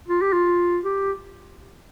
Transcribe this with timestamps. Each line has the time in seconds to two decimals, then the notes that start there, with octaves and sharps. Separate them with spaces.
0.08 F4
0.21 G4
0.33 F4
0.84 G4